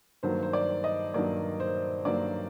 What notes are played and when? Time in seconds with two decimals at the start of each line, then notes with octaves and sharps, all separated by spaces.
0.23 G2 D#3 F#3 A#3 C5
0.43 C5
0.53 D5
0.84 D#5
1.14 G2 D#3 F#3 A#3 D5
1.60 C5
2.05 G2 D#3 F#3 A#3 D5